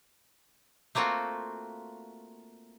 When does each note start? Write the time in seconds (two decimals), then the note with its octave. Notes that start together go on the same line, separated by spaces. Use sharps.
0.95 A3 A#3 C4 F4 F#4